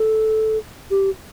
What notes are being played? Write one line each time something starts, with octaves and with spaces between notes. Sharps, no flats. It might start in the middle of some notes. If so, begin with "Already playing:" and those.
Already playing: A4
G4